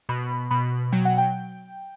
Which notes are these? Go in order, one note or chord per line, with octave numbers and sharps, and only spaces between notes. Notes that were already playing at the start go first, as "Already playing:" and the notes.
B2 B5
B2 B5
F#3 G5
F#5
G5